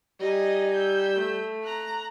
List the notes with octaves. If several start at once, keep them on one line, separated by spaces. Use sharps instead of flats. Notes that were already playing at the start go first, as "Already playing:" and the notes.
G3 D#4 D#5 G#5
E6 G6
A3
A#5 F#6